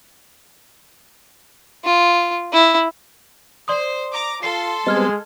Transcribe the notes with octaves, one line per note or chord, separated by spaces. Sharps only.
F4
E4
C5 D5 C6 D#6
A#5 D6
F4 A4 C6 C7
G3 G#3 B3 C4 D#5 F6 G#6